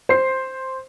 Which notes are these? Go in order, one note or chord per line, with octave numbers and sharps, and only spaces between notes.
C5 C7